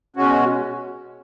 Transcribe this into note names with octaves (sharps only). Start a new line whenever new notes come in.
B2 G#3 C#4 F#4